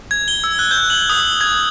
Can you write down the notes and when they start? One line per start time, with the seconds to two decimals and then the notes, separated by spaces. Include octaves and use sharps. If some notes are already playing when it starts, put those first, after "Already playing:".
0.11 G#6
0.28 G7
0.44 E6
0.59 F#6
0.71 G6
0.90 F#7
1.09 D#6
1.41 G#6